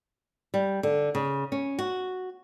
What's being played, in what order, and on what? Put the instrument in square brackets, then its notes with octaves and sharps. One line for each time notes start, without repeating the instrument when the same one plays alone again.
[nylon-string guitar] G3
D3
C#3
C#4
F#4